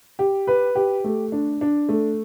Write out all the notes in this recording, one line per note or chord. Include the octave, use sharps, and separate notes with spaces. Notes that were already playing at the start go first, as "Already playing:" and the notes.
G4
B4
G4
A3
D4
D4
A3